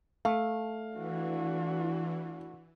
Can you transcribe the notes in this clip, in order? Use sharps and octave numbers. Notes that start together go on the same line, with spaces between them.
A3 F5
E3 D4 F#4